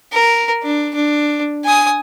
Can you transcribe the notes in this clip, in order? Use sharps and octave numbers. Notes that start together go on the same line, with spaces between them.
A#4
D4
D4
G#5 D#6